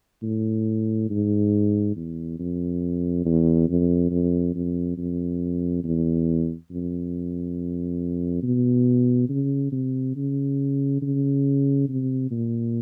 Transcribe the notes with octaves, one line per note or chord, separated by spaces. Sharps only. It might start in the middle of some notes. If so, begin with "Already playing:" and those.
A2
G#2
E2
F2
E2
F2
F2
F2
F2
E2
F2
B2
C#3
C3
C#3
C#3
C3
A#2